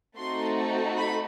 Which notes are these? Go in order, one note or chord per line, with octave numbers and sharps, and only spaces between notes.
A3 C4 D#4 F#4 A4 C6
B5